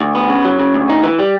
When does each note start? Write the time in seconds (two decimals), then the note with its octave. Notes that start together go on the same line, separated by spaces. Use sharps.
0.01 D2
0.15 B3
0.29 C#3
0.44 F#3
0.59 C#3
0.74 D2
0.89 D#4
1.03 E3
1.19 G3